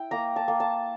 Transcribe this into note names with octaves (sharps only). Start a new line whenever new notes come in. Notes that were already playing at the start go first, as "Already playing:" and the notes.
Already playing: E4 G5
A#3 A#5
A5
A#3
A5